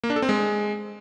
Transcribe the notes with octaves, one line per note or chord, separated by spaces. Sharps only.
A#3
D4
A4
C4
G#3